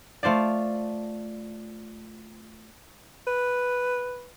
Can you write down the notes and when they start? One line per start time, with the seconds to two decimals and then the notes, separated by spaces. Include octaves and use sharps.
0.23 A3 F4 C5 D5
3.27 B4